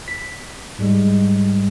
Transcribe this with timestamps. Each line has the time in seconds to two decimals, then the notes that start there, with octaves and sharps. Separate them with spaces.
0.08 B6
0.79 G#2 G3 G#3